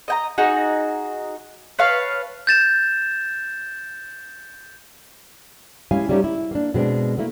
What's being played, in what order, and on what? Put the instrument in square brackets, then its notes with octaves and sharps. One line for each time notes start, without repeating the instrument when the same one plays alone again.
[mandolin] D#5 G5 A#5
D#4 F#4 G#4
B4 C#5 F5 A5
[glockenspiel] G6 A6 E7
[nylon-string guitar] G#3 C#4 E4 G4 F5 G#5
G3 A3 C#4 D#4 G4
E4
A#3 D4
B2 G#3 C4 D4
A3 A#3 E4